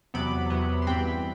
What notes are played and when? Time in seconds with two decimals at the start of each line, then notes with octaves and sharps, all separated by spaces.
0.14 E2 C3 F#3 B3 B5 D6
0.50 E2 C3 F#3 B3
0.82 C6
0.87 G2 E3 G3 C4 G5 B5